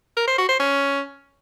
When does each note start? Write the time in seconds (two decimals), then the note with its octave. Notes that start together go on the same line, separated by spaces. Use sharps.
0.17 A#4
0.27 C5
0.38 F#4
0.49 C5
0.60 C#4